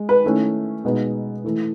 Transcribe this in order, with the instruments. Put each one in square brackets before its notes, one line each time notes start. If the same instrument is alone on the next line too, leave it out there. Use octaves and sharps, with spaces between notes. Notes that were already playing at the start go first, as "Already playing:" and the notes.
Already playing: [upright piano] G#3
B4
D#3 A3 C#4 E4
B2 G#3 B3 D#4
E3 A3 E4